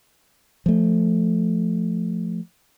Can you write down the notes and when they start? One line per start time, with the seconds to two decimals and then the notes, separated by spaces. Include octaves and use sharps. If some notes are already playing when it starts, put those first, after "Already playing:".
0.66 F3 A3